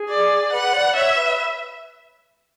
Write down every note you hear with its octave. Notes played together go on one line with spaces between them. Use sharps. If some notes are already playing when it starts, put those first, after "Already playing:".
Already playing: G#4
D5
B4 F#5
D5
C#5 E5
B4